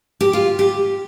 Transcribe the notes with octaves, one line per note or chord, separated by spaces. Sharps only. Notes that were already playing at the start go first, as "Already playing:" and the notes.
G4
F4
G4